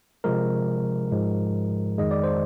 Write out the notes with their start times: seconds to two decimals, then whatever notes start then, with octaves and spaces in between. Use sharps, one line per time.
0.24 C3 F3 G#3 A#4
1.12 G#2 F3 G#3
1.98 F2 D#3 G#3 D#5
2.11 D5
2.24 C5